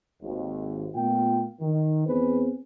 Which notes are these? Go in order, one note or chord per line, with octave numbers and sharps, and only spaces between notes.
G#1 D#2
A#2 A3 B3 F4 G5
D#3
E2 B3 C4 G#4 B4 C5